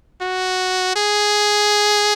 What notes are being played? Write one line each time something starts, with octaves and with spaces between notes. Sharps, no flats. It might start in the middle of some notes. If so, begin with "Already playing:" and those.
F#4
G#4